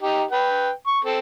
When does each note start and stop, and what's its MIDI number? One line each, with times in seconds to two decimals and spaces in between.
0.02 0.24 63
0.02 0.24 67
0.31 0.71 71
0.31 0.71 79
0.87 0.99 85
1.05 1.19 60
1.05 1.19 69